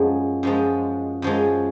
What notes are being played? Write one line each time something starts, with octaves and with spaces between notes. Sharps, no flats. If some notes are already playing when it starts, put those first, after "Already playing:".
Already playing: F#2 F3 G#3
F#2 F3 G#3
F#2 F3 G#3